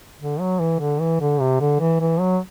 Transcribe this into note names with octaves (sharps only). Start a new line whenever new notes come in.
D3
F#3
E3
D3
E3
D3
C3
D3
E3
E3
F#3